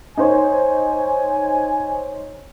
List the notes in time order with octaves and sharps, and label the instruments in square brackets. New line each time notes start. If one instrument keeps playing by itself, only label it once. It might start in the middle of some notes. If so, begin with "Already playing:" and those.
[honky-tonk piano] D#4 C5 C#5 [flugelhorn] G#5